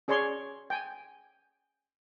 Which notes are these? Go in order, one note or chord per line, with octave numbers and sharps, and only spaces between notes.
C#4 G#4 C#5 D5 C6
G5 G#5